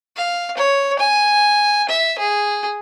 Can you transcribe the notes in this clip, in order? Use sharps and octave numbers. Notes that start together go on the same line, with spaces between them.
F5
C#5
G#5
E5
G#4